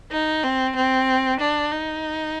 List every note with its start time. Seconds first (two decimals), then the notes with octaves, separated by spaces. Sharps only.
0.11 D#4
0.44 C4
0.76 C4
1.40 D4
1.72 D#4